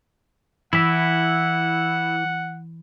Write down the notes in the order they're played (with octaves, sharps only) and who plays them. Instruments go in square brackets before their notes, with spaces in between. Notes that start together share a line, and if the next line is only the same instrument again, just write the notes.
[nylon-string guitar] E3 [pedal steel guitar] E4 E5 [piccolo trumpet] F#5